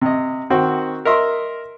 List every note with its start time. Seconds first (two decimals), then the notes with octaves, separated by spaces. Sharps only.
0.01 C3 D#5
0.50 D#3 C4 F#4
1.05 A#4 D#5 E5 C6